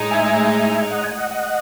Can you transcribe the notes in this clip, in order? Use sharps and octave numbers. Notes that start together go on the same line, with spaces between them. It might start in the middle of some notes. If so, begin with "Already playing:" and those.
Already playing: A2 G#3 D#4
E5 G#5
D#5 F#5
G#5
D#5 F#5
D#5 F#5